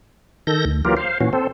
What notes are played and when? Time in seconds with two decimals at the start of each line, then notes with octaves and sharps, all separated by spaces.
0.47 D#3 A4 G6 A#6
0.65 D2
0.85 E3 F#3 A#3 F4 G4 A#4
0.97 C5 F5
1.21 A#2 E3 C#4 F#4
1.33 C4 A4 C5